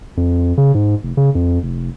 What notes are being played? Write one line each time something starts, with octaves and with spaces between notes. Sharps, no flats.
F2
C#3
G#2
F1
C#3
F2
F1